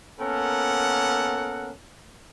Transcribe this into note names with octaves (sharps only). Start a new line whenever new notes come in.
A#3 B3 C#4 A4 A#4 F#5